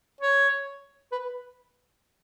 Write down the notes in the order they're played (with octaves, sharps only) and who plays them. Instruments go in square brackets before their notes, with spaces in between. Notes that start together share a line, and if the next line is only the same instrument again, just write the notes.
[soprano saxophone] C#5
B4